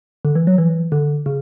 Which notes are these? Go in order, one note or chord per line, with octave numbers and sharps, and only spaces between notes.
D3
E3
F#3
E3
D3
C#3